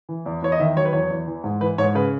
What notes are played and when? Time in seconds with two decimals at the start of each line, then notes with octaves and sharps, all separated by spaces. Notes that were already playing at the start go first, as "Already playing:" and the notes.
0.09 E3
0.26 E2
0.42 E2 C#5
0.52 D#5
0.60 D#3 E5
0.76 F#3 C#5
0.85 B4
0.93 E2 C#5
1.10 E2
1.27 E3
1.44 G#2
1.61 E3 B4
1.78 G#2 C#5
1.95 C#3 B4